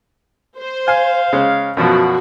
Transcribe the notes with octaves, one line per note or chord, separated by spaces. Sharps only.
C5
F5 G#5
C#3 G#3
F#2 B2 F3 F#4